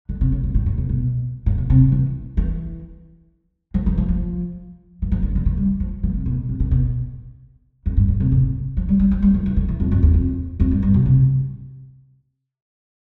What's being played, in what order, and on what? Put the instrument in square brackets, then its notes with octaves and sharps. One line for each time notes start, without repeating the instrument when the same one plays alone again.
[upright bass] D3
C3
A2
B2
A2
A2
B2
B2
A2
B2
C3
E3
E3
F3
E3
F3
F3
E3
F3
D3
D3
E3
G3
F3
E3
C3
B2
C3
B2
B2
F2
G2
A2
C3
C3
F3
G3
G3
F3
G3
F3
E3
D3
E3
F2
F2
E2
F2
F2
G2
G2
B2
C3